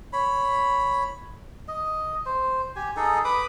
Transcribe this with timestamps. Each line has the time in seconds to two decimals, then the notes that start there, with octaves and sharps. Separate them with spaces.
0.13 C#5 B5
1.68 D#5
2.26 C5
2.76 G4 G#5
2.96 D#4 G#4 A4
3.25 B4 B5 D6 D#6